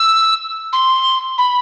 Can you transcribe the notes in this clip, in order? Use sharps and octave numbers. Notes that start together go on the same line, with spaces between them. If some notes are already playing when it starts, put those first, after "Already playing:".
Already playing: E6
C6
B5